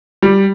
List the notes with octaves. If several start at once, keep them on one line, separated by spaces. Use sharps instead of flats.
G3